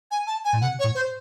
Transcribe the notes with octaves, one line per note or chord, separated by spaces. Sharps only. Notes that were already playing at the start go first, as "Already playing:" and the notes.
G#5
A5
G#5
A2
C3 F#5
C#5
A2
C5